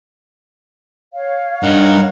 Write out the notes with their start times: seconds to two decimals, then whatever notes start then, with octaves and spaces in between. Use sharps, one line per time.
1.13 C#5 F5
1.63 G2 D#4 A#4 F#5